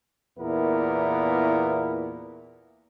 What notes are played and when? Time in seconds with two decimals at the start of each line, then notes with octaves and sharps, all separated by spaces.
0.38 E2 A#2 B3 E4 A#4